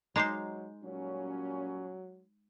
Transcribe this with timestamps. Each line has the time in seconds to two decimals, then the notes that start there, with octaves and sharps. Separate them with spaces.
0.16 F#3 G#3 D#4 C5 A#5 D6 C7
0.84 A#2 F#3 G3 C#4